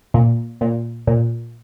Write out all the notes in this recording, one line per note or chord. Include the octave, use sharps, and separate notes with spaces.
A#2
A#2
A#2